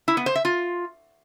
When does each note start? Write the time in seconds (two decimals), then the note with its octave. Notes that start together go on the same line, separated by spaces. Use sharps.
0.08 E4
0.17 B3
0.26 C5
0.35 E5
0.45 F4